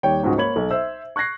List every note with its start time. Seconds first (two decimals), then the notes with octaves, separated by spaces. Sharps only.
0.03 D#2 G3 C#5 G5
0.23 C#2 G#2 F3 G#3 F#4
0.37 A#3 C#5 B5 G#6 F#7
0.56 B1
0.71 C5 E5 E6
1.16 C#6 F#6 G#6 A#6 C7